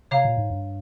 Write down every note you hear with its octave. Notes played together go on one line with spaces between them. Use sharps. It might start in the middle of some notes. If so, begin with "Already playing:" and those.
C3 C#5 F5 A#5
A#2
G#2
G2